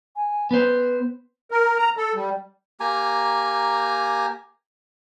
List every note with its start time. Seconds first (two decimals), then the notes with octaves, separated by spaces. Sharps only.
0.16 G#5
0.51 B3 B4 C5
1.51 A#4
1.78 A#5
1.97 A4
2.15 G3
2.80 A#3 G4 G#5 A#5